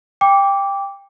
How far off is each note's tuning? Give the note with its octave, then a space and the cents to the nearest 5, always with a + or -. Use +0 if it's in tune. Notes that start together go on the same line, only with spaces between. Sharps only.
G5 +15 D6 -15